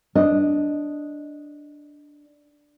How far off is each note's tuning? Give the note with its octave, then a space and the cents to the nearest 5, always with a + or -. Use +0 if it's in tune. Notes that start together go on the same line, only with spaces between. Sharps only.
D4 +0 D#5 +0